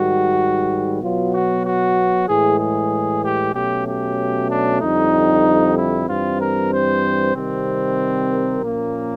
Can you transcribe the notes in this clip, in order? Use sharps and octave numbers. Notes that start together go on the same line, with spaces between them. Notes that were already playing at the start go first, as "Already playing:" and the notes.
Already playing: G#2 D#3 G3 F#4
B2 F#3 B3 F4
F#4
F#4
A2 E3 G#3 G#4
G#4
G4
B2 F#3 A3 C#4 G4
G4
D4
F2 D3 G3 D#4
E4
G2 E3 G3 C4 F4
A#4
C5
C3 D#3 G3 C4
A#4
A#2 F3 A#3 C#4